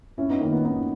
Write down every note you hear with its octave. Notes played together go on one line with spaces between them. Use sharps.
F#2 C#4 E4
B3 D#4
D#3 A#3 C#4
B3 D#4
F#2 B3 D#4